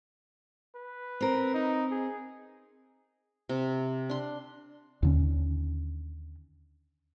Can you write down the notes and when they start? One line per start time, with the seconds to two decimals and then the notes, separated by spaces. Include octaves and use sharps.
0.75 B4
1.21 C4 A#4
1.54 D#4
1.91 G#4
3.49 C3
4.09 D4 C6
5.03 D#2 D3 C#4